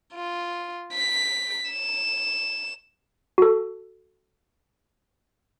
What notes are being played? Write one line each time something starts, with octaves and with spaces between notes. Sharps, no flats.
F4
B6
E7
F#4 A4